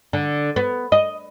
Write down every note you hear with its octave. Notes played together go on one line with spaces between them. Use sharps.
D3
B3
D#5